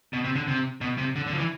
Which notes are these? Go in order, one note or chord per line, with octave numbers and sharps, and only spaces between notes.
B2
C3
D3
C3
B2
C3
D3
D3
F3
E3